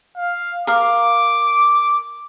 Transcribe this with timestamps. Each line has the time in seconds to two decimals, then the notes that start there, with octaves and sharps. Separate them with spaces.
0.16 F5
0.67 A#4 F5 D6